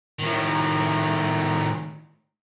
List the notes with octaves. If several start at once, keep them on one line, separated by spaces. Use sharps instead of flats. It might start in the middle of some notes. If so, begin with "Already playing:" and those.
A2 D#3